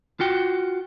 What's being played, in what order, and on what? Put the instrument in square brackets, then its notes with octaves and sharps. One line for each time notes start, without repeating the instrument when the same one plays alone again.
[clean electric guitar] F4 F#4 G5